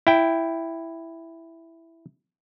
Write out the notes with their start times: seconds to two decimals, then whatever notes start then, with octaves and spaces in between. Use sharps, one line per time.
0.07 E4 G5